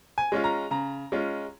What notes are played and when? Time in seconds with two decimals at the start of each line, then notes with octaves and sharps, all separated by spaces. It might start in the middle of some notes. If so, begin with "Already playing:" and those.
0.18 G#5
0.32 G#3 C#4 F4
0.44 A#5
0.71 C#3 A#5
1.12 G#3 C#4 F4